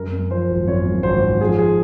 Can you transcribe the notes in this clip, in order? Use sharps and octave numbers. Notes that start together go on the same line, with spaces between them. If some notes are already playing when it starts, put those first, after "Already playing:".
Already playing: F#2 A#4
F#2
F3 C5
G#1
F#2 C#5
F#2
G#1 C5
G#1
F3 G#4
G#4